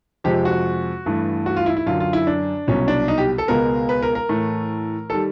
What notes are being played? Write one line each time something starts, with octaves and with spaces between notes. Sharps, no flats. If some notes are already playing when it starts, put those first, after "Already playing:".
F2 C3 F3 G#3 G4
F#4
G2 E3 A3
F#4
F4
E4
E4
F#2 D3 F#3 F4
F4
E4
D4
C2 B2 F#3 C#4
D4
D#4
G4
A4
C#2 B2 G#3 B3 A#4
B4
A#4
A#4
A2 E3 A3
D#3 G3 A4